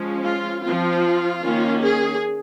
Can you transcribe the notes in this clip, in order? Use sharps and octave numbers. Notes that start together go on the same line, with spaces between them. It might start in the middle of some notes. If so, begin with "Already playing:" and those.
Already playing: F3 G#3 C#4
F4
F3 C4 F4
D#3 A#3 C#4
G#4